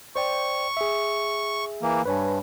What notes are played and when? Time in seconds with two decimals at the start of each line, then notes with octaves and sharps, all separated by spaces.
0.16 C5 D5 G5 C#6
0.77 G#4 E5
1.82 E3 A#3
2.06 G2 B4 C#5 G#5